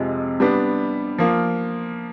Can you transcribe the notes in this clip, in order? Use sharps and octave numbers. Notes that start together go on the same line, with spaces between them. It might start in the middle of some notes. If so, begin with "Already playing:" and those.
Already playing: F2 C3 F3 G#3
G3 B3 D4
F3 A#3